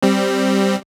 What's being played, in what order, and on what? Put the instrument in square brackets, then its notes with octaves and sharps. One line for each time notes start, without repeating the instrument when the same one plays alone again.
[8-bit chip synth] G3 C4